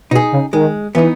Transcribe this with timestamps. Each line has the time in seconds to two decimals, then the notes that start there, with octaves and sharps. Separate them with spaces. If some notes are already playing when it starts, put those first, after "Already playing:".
0.11 B2 D#4 G#4
0.32 C#3
0.53 D#3 G#3
0.95 E3 B3 D#4